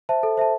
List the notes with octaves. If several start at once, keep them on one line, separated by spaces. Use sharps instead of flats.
C5 E5 A5
A4
C5 E5 A5